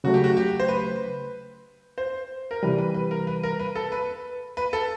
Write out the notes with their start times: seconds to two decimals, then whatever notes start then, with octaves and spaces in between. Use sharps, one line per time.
0.04 C#3 F#3 A3 F#4
0.14 G4
0.24 F#4
0.37 G4
0.60 C5
0.69 B4
1.98 C5
2.51 A#4
2.63 C3 E3 G3 B4
2.78 B4
2.94 B4
3.11 A#4
3.27 B4
3.43 A#4
3.59 B4
3.75 A4
3.92 B4
4.57 B4
4.73 A4